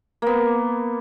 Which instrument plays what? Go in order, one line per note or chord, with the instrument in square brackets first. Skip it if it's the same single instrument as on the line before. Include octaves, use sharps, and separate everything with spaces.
[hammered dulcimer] A#3 B3